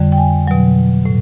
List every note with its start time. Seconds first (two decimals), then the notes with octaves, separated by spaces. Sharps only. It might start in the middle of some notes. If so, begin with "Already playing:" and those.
Already playing: F2 D3 G3
0.12 G5
0.18 G#5
0.48 B2 F#3
1.06 A2